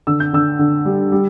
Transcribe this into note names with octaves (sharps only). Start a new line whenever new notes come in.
D3 E6
G6
D3 E6
D3
G3
G3